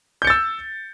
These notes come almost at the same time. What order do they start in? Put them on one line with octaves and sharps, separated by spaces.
G6 C#7 A6 E6